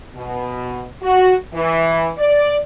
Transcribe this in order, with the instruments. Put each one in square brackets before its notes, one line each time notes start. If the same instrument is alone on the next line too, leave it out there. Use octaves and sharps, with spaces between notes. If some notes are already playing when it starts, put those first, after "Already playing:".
[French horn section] B2
F#4
E3
D5